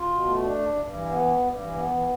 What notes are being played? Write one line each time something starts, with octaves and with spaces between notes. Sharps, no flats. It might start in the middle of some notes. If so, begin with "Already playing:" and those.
Already playing: F4
B2
A3
D4
G2
G2
E3
B3
G2
G2
E3
B3
E3